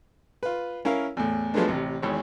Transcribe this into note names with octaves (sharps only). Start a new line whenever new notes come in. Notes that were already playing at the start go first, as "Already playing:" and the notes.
F4 B4
C#4 E4 A#4 F5
E2 A2
F3 F#3 G#3 A3 B3 D4
A1 C3
G#1 E2 C#5